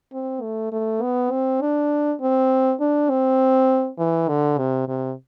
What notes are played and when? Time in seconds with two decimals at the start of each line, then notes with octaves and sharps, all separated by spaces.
0.13 C4
0.42 A3
0.72 A3
1.02 B3
1.31 C4
1.61 D4
2.21 C4
2.80 D4
3.10 C4
3.98 E3
4.28 D3
4.58 C3
4.88 C3